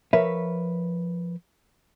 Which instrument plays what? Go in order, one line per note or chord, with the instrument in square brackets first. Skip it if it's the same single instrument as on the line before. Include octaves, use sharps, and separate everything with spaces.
[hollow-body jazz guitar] F3 A#4 B4 C#5 E5